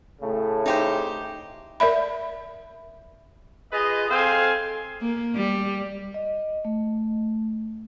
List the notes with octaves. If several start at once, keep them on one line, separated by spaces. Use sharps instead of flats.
A2 C#3 A3
D#4 G4 C5
A#4 D5 E5 B5
F4 G#4 B4 D#5
C4 A4 C5 F5 G#5
A#3
G3
D#5
A3